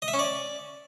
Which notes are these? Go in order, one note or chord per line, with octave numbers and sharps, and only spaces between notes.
D#5
E5
C#4
D5